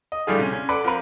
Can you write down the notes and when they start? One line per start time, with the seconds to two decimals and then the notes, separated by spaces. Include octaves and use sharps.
0.12 D#5
0.27 A2 D3 G3 A3 F4 G#4
0.39 C3 C#4
0.53 C#4
0.69 A4 B4 D5 F#5 B5
0.84 F3 C4 A#4 B4